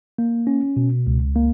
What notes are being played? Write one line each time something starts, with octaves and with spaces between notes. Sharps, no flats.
A#3
C#4
B2
C#2
A#3